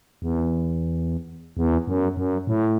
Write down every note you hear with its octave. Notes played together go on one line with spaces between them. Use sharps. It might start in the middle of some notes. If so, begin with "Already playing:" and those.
E2
E2
F#2
F#2
A2